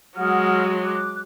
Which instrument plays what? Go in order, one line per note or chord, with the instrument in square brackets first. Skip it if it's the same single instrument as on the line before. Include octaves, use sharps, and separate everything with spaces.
[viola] F#3 G#3 [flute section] F#5 D#6 F6
[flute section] D6 F#6